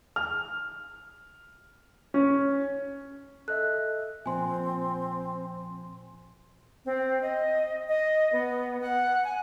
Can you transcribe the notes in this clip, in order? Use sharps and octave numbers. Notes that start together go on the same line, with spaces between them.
F6
C#4
A4 D#5 E5 F#6
A#2 F3 C4 G#5 C6
C4
D#5
D#5
B3
F#5
G#5